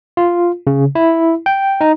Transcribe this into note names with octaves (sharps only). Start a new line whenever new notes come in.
F4
C#3
E4
G5
D#4